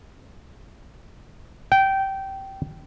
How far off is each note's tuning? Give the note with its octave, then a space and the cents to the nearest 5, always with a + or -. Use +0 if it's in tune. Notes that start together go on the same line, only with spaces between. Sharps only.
G5 -15